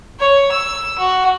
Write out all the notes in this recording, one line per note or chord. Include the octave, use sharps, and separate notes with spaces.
C#5
E6
F#4